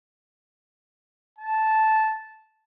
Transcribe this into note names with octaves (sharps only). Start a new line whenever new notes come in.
A5